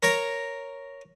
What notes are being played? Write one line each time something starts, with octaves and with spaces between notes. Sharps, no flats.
A#4 C#5 A#5